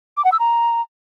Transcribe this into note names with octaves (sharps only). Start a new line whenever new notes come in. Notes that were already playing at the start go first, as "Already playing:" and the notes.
D6
F#5
E6
A#5